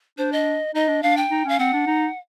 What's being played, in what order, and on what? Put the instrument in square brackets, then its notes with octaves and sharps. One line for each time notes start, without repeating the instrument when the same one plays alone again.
[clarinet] D4 [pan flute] C5
[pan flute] D#5
[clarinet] D#4 [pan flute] D#5
[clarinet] D4
[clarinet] D4 [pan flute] F5
[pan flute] G5
[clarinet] D#4
[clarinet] C#4 [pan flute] F5
[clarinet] C4 [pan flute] F#5
[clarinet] D4
D#4